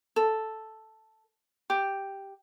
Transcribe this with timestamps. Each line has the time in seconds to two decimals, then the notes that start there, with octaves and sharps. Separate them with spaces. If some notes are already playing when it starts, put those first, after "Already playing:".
0.16 A4
1.70 G4